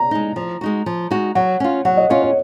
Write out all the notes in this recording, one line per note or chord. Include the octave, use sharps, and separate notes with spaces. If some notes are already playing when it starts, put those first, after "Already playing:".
Already playing: A#5
G#3 D#4
F3
G#3 D#4 F#4
F3
G#3 D#4 F#4
F#3 F#5
C#4 F4
F#3 F#5
D#5
C#4 F4 C#5
C#5